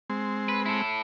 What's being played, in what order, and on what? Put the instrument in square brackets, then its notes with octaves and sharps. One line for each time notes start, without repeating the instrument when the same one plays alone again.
[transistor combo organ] G#3 C4
[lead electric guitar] B4
E4 A4